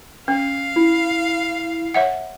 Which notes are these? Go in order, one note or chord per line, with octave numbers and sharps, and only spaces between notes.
C#4 F5
E4
C#5 E5 F#5